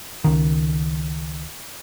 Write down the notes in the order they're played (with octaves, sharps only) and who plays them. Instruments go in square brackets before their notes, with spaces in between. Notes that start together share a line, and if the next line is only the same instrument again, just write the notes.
[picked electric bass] C#2 D#3